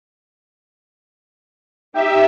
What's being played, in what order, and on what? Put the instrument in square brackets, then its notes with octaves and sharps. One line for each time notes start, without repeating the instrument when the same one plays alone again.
[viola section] D#4 [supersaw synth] G4 E5